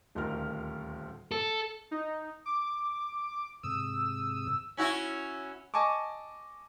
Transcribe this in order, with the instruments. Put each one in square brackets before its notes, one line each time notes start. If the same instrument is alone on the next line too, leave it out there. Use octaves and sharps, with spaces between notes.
[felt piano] D#1 D2 D#4 F4 A#4 F6
[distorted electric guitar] A4
[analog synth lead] D#4
D6
[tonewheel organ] G#2 C3 D#6 [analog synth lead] E6
[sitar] C#4 E4 F#4
[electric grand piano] D#5 G#5 A5 C#6 D6